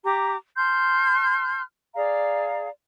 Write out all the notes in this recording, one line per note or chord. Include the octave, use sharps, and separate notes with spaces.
G4 A#5 D6
A5 C6 F6 G6
G#4 D5 F5 A#5